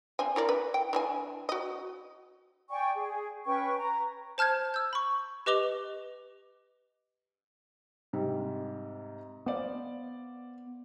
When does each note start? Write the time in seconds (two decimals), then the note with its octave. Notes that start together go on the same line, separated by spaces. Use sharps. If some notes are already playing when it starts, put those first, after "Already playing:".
0.19 C4 D4 G#5
0.36 E4 A#4 D5
0.49 B4
0.74 G5
0.93 E3 D4 G#5
1.49 F#4 D#5
2.70 D5 G5 G#5 C#6
2.95 G#4
3.46 C#4 B4 G5 C#6
3.77 A#5
4.38 C5 A5 F6 G6 G#6
4.74 E6 G6
4.93 B5 C#6
5.46 G4 B4 D#5 D6 F7 G7
8.13 G#2 C3 G3
9.46 B3 C5 D5 F5